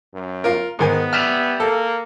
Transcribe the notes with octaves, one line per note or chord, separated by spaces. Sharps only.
F#2
F4 A#4
G#2 D#3 B3 G#5
G4 D5 E5 F6
A#3 A4